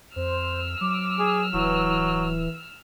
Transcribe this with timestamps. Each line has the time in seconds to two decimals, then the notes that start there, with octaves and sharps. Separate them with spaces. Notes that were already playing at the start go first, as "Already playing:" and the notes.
0.16 F2 C5 E6 F6
0.81 F#3 D6
1.19 G#4
1.53 D1 E3 F#3